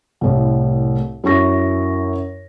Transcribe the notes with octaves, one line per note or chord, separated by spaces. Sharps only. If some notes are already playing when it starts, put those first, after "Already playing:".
C2 A2
F#2 E4 C#6 A#6